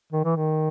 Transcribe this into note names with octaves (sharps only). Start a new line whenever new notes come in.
D#3
E3
D#3